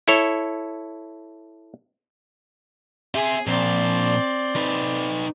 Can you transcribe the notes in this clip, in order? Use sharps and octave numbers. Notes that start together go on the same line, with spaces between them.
E4 A4 C#5
C4 G#4 E5
A#2 F3 C4 D5
D#4 B4